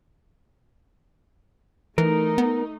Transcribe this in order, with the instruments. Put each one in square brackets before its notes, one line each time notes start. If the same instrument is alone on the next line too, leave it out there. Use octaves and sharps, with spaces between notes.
[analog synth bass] E3 [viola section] A3 D#4 [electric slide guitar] A#4
[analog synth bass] B3